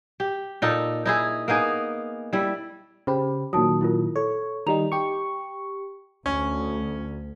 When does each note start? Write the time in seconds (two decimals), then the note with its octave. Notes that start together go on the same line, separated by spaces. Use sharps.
0.20 G4
0.62 A#2 D#4 A4
1.06 D#4 E4 G#4
1.48 A#3 B3 D#4 G#4
2.33 G3 E4
3.07 C#3 G4 C5 B5
3.53 A#2 D#3 F#3 A5 D#6
3.81 E4 F4 A#4
4.16 A4 C#5
4.67 D#3 G3 D#4 A#5 F7
4.92 G4 C#6
6.26 D2 C#4